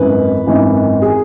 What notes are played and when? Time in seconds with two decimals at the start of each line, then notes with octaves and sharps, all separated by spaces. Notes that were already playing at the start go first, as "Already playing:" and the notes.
Already playing: G#1 F#2 E3 B4
0.46 G#1 F#2 E3
1.02 G#4